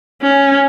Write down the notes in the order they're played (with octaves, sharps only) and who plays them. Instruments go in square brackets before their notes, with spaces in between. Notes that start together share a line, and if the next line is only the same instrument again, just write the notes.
[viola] C#4